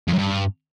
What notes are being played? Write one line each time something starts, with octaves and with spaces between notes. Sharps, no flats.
F2
F#2
G2